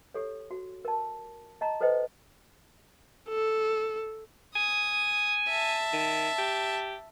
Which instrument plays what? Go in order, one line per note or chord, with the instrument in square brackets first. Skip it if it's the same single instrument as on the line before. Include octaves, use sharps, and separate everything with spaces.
[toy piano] G4 A4 C#5
F#4
A#4 A5
D#5 A5 A#5
A4 B4 C5 D#5 G5
[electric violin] A4
[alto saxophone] G#5 [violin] D#6
[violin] E5 A5
[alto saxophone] D#3
G4